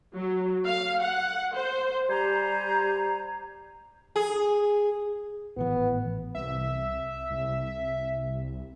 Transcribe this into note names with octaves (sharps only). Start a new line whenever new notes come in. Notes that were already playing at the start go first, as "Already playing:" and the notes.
F#3
F5
F#5
C5
G3 G4 C5 G#5 A#5
G#4
G#1 A2 E3 B3
C2 E5
C2